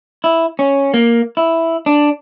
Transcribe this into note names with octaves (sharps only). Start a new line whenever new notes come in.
E4
C#4
A#3
E4
D4